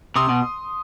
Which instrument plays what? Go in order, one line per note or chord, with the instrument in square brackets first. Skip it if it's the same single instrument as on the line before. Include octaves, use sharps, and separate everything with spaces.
[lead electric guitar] C3 [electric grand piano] C6 D#6
[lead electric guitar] B2